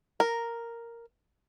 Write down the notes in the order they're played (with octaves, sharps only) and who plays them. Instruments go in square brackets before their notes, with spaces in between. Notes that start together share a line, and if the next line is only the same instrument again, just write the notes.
[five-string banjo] A#4